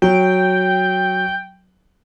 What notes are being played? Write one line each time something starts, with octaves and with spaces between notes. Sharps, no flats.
F#3 G5